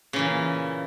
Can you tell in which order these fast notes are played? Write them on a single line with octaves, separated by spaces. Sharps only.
C#3 E3 A#2